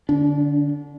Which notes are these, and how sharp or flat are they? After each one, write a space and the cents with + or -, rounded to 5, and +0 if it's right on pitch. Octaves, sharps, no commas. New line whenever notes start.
D3 +5 D4 -35